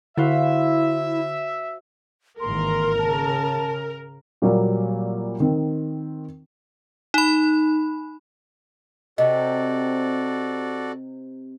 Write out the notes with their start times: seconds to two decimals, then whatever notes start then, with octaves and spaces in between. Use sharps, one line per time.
0.17 D3 E4 F#4 C5 E5 F5
2.40 G#1 E3 A#3 A#4 C6
2.99 C#3 A5
4.42 A#2 F#3 G3 A#3
5.40 D#3 C4
7.14 D#4 B5
9.18 C3 F#4 A4 D5 D#5